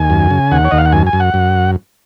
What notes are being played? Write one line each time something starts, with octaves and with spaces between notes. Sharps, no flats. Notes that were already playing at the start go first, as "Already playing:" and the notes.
Already playing: D#2 G#5
F#2
C#3
D#2 F#5
C#5
D#2 D#5
F5
F#5
F#2 G#5
G#5
F#2
F#5
F#2